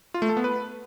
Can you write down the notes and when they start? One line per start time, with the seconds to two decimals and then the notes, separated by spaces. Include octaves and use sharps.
0.14 F4
0.22 A3
0.29 A4
0.37 B3
0.44 B4